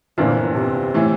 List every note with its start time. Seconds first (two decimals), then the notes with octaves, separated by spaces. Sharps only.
0.18 G1 F2 A#2 E3 A#3 D4
0.55 C3
0.94 A2 E3